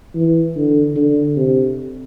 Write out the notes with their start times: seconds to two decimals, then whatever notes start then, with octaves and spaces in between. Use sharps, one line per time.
0.15 E3
0.56 D3
0.96 D3
1.37 C3